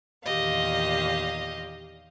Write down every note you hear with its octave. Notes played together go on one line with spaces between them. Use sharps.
E2 A#2 D#3 G4 D#5 F5